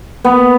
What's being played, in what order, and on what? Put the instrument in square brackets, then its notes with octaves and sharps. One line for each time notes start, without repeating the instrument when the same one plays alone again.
[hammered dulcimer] B3